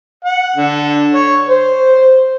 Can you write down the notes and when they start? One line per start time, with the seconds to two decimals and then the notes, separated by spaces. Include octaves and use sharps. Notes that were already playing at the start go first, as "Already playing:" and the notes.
0.24 F#5
0.56 D3
1.14 C#5
1.49 C5